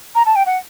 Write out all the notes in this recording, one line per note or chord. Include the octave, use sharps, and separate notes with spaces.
A#5
A5
G5
F#5